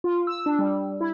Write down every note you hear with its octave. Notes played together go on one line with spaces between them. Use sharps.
F4
E6
D4
G3
E4